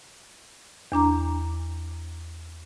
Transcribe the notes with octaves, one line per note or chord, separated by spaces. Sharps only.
E2 D4 A#5 D6